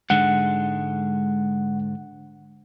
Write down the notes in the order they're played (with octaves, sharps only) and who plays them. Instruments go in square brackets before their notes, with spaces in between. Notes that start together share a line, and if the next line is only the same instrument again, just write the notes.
[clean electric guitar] G#2 D3 G#3 [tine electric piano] F#5